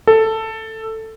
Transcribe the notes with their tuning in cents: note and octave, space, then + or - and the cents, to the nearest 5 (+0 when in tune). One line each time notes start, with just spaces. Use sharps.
A4 +10